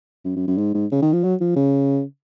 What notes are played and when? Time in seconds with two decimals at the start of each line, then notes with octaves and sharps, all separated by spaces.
0.25 F#2
0.36 F#2
0.48 F#2
0.58 G#2
0.74 G#2
0.91 C#3
1.02 D#3
1.13 F3
1.23 F#3
1.41 F3
1.56 C#3